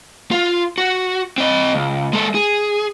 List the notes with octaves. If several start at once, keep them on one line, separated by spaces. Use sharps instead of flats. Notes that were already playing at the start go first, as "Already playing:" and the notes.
F4
F#4
C4 D#5
C#2
G#3 A4
G#4